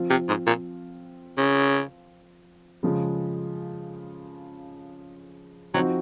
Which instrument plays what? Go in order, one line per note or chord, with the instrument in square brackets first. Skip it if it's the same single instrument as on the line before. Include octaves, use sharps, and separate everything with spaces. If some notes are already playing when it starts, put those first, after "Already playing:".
Already playing: [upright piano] F3 C4 F4
[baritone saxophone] C3
G#2
A#2
C#3
[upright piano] C#3 F3 G#3
[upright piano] F3 C4 D#4 F#4 [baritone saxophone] F#3